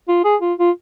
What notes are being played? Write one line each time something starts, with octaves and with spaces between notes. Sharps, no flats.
F4
G#4
F4
F4